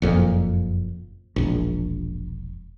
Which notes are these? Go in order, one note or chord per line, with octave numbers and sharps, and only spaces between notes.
F#1 F2 A#2
E1 A#1